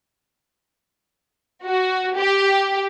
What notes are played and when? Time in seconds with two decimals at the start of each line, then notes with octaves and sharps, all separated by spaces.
1.65 F#4
2.16 G4